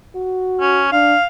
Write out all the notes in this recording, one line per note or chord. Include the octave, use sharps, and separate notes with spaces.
F#4
C#4
D4 F5